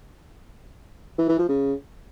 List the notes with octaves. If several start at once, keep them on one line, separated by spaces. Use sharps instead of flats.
E3
E3
F3
C#3